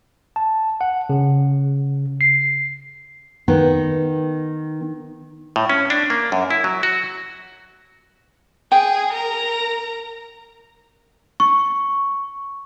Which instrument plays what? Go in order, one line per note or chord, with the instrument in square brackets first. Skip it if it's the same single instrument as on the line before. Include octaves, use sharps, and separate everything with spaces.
[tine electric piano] A5
F#5
C#3
C7
[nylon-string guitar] D#3 B3
[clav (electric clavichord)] A2
C#4
D4
A#3
F#2
E4
F#3
F#4
[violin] G#4 [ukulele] G5
[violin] A#4 A#5
[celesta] C#6